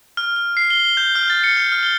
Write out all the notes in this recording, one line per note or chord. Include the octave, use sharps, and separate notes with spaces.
F6
F6
C7
G7
G7
G6
F6
A6
C#7
G6
F6
G7